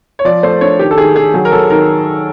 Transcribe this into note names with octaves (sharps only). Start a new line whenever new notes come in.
C#5
F3 D5
A3 C5
D4 C#5
D#3 G4
A4
D#3 G#4
D#3 G#4
F#3 G#4
A#4
F#3 A4
D#3 A#4